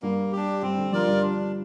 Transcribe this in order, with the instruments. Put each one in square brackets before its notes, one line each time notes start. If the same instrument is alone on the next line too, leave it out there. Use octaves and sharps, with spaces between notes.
[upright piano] G2 G3 [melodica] A#3
[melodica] D4 G4
[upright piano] G2 G3 [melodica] C4
[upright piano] D3
[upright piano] F3 [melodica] F4 A#4 D5
[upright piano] G2 G3
[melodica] D4